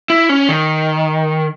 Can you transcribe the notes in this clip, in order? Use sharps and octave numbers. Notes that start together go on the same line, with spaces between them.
E4
C#4
D#3